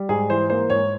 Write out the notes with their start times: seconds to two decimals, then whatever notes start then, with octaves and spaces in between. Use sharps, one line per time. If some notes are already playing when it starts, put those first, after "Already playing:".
Already playing: G3
0.09 G#2 G#4
0.30 E3 C5
0.50 A#3 C5
0.70 G#2 C#5